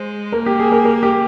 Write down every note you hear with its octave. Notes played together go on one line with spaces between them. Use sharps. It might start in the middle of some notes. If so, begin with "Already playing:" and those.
Already playing: G#3 C5
A#3 A#4
G4
G#4
A#4
A#4
G4